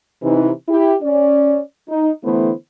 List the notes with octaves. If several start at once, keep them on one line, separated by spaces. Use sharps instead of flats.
C3 E3 D#4
E4 G4
C#4 D5
D#4
D3 E3 A3 B3 E4 C5